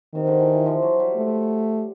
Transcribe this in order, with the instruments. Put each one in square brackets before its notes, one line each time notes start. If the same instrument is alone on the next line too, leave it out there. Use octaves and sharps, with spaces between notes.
[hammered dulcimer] C3 [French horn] D#3
[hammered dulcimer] D3
E3
E3
F3
F#3
G3
[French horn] A3